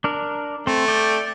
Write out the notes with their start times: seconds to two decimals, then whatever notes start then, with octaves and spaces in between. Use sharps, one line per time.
0.04 D4 A#4
0.67 A3 C4
0.88 D5 G5